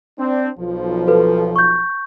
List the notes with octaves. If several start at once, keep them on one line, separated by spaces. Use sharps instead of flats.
C4 D4
B1 F3
F#4 A4 B4
C#6 G6